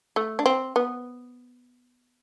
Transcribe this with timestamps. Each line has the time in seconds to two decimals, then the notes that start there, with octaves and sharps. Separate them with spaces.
0.16 A3
0.39 D4
0.46 C4
0.76 B3